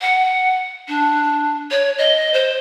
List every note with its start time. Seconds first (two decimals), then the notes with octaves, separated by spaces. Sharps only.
0.01 F#5
0.88 D4
1.71 C#5
1.98 D#5
2.34 C5